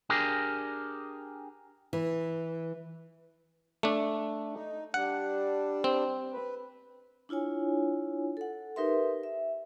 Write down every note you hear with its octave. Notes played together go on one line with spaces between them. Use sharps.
D4 G4 G#4 A#4
E3
A3 D4
D#4
G3 D4 F#5
C4
B4
D4 E4 F4 C#5 G#5
A4 F#5
D#4 G4 A#4 B4 E5 C6
E5